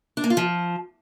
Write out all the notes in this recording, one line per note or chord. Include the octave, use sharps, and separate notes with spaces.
D4
A#3
F4
F3